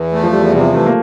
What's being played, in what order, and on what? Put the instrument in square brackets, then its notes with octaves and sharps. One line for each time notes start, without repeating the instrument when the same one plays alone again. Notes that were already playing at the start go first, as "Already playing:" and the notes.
Already playing: [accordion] E2 [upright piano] E3
[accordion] A3
[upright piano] F3
[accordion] E2 [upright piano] G3
[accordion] C3
[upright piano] F3
[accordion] E3 [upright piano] A3
[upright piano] A#3